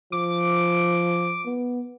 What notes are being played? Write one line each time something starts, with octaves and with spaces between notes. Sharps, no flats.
F3 D6
B3